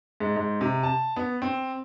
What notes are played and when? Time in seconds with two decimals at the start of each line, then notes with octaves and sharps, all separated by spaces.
0.20 G#2
0.36 G#2
0.61 C3
0.83 A5
1.16 B3
1.42 C4